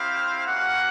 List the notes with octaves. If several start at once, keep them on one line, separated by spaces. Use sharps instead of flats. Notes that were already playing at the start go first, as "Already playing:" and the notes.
Already playing: C4 E4 G4 F5
A#3 C#4 F#4 F#5